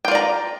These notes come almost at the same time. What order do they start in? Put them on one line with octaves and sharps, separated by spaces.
G5 F4 D5 A#5